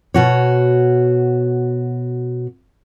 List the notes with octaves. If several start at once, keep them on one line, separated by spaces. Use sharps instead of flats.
B2 F#4 C#5